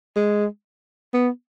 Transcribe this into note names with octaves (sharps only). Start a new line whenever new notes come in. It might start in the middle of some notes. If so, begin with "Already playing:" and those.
G#3
B3